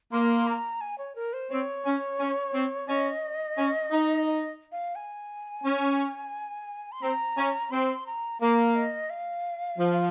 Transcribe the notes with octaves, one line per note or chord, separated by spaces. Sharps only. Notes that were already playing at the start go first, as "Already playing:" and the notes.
A#3 C6
A#5
G#5
C#5
A#4
C5
C4 C#5
C#4
C#4
C4
C#4 D#5
C#4
D#4
D#5
F5
G#5
C#4
C6
C4 A#5
C#4
C4 C6
A#5
A#3 F5
D#5
F5
F3